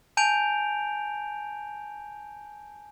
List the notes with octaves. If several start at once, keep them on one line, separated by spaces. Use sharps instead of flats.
G#5 A5 G6 D7 F7